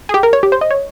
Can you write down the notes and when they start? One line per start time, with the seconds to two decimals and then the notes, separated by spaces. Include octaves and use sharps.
0.09 G#4
0.14 G4
0.23 A#4
0.33 C#5
0.43 G4
0.52 C5
0.61 D#5
0.71 C#5